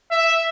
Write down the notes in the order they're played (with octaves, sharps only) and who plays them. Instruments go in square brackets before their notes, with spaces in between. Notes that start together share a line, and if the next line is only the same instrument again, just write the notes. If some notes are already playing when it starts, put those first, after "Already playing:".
[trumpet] E5